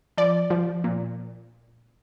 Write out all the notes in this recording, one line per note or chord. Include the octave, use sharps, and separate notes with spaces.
F3 D5
F3
A#2